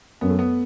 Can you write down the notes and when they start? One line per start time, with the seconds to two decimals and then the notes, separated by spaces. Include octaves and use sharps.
0.21 F#2 B3
0.30 A3
0.39 B3